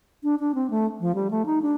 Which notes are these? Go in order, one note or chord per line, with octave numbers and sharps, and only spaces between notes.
D4
D4
C4
A3
F3
G3
A3
D#4
D4